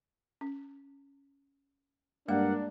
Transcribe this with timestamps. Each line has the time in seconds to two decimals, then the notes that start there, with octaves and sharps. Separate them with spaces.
0.41 C#4
2.28 G2 G#3 A#3 D4 A#4 F5 F#5